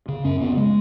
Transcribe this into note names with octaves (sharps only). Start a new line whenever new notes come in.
C#3
F#2 C#4
C#3 B3
G#3